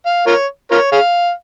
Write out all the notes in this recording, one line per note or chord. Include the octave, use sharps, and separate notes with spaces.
F5
F4 A#4 C#5
F4 A#4 C#5
G#4 C#5 F5